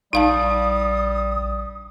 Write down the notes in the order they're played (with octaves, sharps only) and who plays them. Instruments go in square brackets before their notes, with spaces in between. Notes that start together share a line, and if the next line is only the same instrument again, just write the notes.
[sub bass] A#1 [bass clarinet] G3 [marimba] D#4 F5 A5 [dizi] D#6